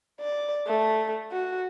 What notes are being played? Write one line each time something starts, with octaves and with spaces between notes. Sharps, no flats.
D5
A3
F#4